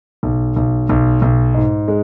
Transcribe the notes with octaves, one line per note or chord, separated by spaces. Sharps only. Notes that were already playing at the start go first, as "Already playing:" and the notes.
B1
B1
B1
B1
G#2
G#3